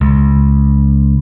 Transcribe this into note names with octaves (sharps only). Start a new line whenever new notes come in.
C#2